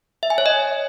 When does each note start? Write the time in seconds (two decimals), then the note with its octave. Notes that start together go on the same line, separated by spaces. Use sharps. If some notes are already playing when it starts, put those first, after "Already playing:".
0.23 E5
0.30 G#5
0.38 C#5
0.46 D#5